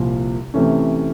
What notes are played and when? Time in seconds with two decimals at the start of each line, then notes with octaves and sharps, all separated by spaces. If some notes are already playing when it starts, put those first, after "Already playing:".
Already playing: C2 A#2 F3
0.54 C3 E3 A3 C#4